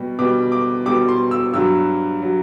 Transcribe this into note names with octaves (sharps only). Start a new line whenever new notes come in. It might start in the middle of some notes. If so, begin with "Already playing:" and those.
Already playing: B2 G3
B2 G3 D6
D6
B2 G3 D6
C6
E6
G2 F#3 E6
F#3